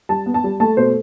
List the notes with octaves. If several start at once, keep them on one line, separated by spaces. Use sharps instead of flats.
G3 A5
B3
A5
G3
A3 A5
B2 C5